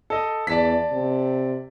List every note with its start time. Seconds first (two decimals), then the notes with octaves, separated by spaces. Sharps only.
0.10 A4 D#5
0.47 E2 D5 A5 B6
0.92 C3